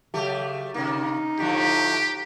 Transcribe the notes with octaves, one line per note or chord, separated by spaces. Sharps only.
C#3 F#3 A3 G4
C3 A#3 D#4
A2 D3 F3 G4